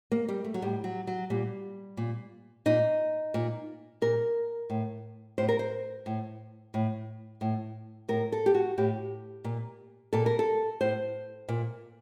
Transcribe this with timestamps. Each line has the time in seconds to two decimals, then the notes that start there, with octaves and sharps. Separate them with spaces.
0.12 A#3
0.28 G3
0.44 A3
0.54 F#3
0.62 A2 G3
0.84 F#3
1.07 F#3
1.30 A#2 G3
1.97 A#2
2.66 A#2 D#4
3.34 A#2
4.02 A#2 A#4
4.70 A2
5.38 A2 C5
5.49 A#4
5.59 C5
6.06 A2
6.74 A2
7.41 A2
8.08 A2 A#4
8.32 A4
8.46 G4
8.55 F#4
8.78 A2 G4
9.44 A#2
10.13 A#2 A4
10.26 A#4
10.39 A4
10.81 A2 C5
11.49 A#2